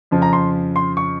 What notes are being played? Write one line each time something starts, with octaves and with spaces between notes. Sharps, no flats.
F2 C#3 F3
A#5
C6
C6
C#6